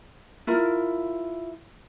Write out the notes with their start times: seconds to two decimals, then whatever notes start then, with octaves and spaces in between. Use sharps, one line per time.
0.47 E4 F4 A#4